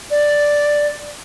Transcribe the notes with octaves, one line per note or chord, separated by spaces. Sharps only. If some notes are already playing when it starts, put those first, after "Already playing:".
D5